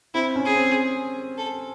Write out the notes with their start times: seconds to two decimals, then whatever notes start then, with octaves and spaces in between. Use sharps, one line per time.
0.14 C4 E4
0.36 C#4
0.45 G#4
0.56 C4
1.38 A4